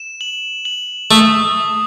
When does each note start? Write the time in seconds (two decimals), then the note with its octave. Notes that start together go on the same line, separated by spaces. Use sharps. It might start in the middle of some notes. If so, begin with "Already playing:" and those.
Already playing: E7
0.21 F#7
0.65 F#7
1.11 A3 D#6